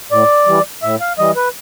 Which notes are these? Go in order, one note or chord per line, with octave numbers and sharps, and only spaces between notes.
A2 D5
E3 G3
A2 E5
F5
E3 G3 D#5
B4